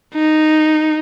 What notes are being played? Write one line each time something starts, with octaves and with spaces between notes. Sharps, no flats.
D#4